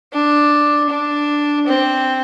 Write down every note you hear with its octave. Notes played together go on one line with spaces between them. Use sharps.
D4
D4
C4